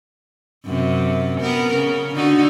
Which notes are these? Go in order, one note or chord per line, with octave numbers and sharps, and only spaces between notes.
F#2 C3
B3 A#4
C#3
D3 D#4 F#4